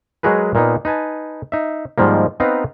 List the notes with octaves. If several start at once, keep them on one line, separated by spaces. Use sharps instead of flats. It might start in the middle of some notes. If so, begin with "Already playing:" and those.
F#3 G#3 F#4 G#4 A#4 B4
A#2 A#3 B3 D#4
D#4 B4 G#5 A5
D#4 E5
G#2 D#3 F3 G3 A#3
B3 C4 D#4 B4 F5 A#5